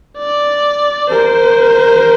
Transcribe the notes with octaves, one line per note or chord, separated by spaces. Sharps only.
D5
A#4 C5